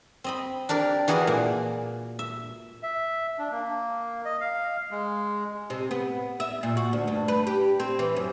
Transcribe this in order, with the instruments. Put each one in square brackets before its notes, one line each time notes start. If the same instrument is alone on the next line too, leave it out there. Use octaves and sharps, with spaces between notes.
[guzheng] C4 D#5 B5
D4 G4 A#4 D5
E3 F#4 G#4 A#4 B4 D5
A#2
E5
[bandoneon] E5
D4
A#3
D#5
F5
G#3
[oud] C3
B3
E5
A#2
F#4
D2
G2
B4
G4
C4
E3
F#2